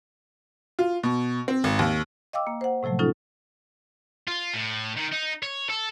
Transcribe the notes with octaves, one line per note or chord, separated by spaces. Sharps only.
F4
B2
C4
G#1
D#2
D#5 F5 G5 D6 E6
A#3
C5 F#5
A2 C3 F3 F#3 A3
C#4 D#4 F4 A4
F4
A2
D#3
D#4
C#5
A4